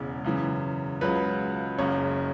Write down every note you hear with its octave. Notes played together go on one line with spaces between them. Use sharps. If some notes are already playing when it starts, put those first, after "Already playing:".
Already playing: E1 E2 C#3 G#3
F#2 C#3 E3
C#2 C#3 F#3 B4
F#1 F#2 C#3 C#5